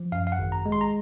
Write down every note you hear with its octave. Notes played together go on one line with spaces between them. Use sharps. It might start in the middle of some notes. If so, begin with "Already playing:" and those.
Already playing: F3
F#2 F5
F5
F#5
G#1
A#5
G#3
C6
A#5